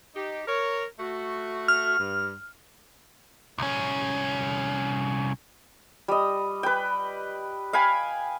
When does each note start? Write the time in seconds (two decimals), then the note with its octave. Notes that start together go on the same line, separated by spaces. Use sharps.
0.15 D#4 G4
0.46 A#4 C#5
0.99 A3 F#4
1.68 F6
1.99 G2
3.58 C2 C#4
6.08 G3 D#5
6.63 B4 G5
7.73 F5 G5 G#5 B5